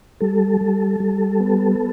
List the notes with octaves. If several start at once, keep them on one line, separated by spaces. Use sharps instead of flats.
G3 A4
G3
G3
B3